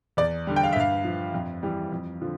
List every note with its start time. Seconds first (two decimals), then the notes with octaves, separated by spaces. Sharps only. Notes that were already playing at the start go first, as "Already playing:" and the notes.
0.17 E2 D5
0.47 D3 G3
0.56 G5
0.63 F5
0.72 E5
0.76 G2 F5
1.05 F3
1.34 F2
1.63 E3 G3
1.92 F2
2.21 D3 F3